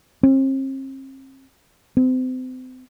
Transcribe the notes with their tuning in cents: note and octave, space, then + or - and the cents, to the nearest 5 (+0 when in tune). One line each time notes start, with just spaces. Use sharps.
C4 +40
C4 -35